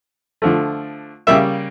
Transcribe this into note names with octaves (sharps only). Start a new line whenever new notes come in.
D3 F3 A3
C#3 G3 A#3 E5